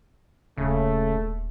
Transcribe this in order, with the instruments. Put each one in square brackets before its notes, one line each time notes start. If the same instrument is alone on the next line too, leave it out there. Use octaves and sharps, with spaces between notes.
[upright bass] D#1 [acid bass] C#3 [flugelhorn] A3